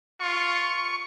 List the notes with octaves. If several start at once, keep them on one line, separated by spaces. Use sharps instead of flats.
F4 C#6